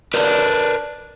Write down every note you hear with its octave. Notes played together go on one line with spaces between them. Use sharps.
D4 A#4 B4 D5